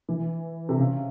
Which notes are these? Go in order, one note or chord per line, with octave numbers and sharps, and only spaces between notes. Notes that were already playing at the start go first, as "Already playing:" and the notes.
E3
C3
C#3